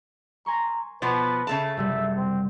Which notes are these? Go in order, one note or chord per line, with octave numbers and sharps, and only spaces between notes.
G#5 A#5 C6 C#6
B2 F3 B3 B4
C#3 A3 A5
F#1 C3 G3 E5
C4